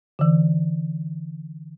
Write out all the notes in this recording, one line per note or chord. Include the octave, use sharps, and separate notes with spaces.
D3 E3